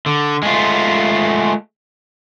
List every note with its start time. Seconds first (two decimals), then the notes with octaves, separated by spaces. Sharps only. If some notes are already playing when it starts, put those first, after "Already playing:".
0.06 D3
0.43 G#3 A3 F4